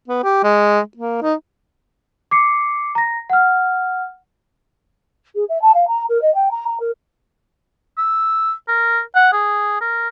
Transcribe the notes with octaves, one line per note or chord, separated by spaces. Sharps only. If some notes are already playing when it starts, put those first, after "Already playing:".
B3
G4
G#3
A#3
D#4
D6 C7 C#7
A#5 A#6
F#5 F6
G#4
E5
A5
F5
A#5
A#4
D#5
G5
A#5
A#5
A#4
E6
A#4
F#5
G#4
A#4